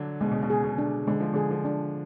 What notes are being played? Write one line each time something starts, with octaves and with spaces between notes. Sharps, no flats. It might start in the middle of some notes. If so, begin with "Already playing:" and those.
Already playing: D3 F#3 D4
B2 G#3
C#3
B2
G#4
B2
D4
D3 G#3
F3
D3 G#4
F3
D4